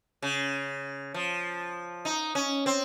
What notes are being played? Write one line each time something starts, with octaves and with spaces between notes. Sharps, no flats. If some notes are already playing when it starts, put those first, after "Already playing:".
C#3
F3
D#4
C#4
C4